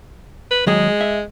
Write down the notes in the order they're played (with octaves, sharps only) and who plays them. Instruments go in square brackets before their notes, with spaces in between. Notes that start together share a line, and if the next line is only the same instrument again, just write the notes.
[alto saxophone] B4
[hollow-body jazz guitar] D#2 F#3 G#4 [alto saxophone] G#3
[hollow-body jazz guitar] E5